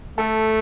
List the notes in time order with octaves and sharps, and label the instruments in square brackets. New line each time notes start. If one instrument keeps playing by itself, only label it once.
[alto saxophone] A3 [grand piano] A4